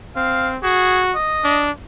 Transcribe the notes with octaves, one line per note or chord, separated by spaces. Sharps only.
C4 F5
F#4 G#4
D#5
D4